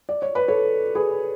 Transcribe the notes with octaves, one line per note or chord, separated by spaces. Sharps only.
D5
C#5
B4
A4 C#5
G#4 B4